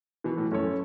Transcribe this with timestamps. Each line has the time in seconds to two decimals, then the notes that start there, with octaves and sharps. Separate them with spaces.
0.24 B2 E3
0.37 A2
0.51 F#2 C#4 A4 C#5